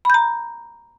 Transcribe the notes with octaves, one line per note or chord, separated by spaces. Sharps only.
A#5 B5 G6